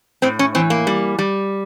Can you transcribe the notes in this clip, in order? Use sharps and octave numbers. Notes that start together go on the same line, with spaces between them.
A2 C4
C#4
E3 C4
A#3
G3
G3